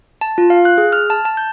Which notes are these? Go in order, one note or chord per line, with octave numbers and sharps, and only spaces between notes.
A5
F4
F5
F#6
G#4
F6
A5
A5
G6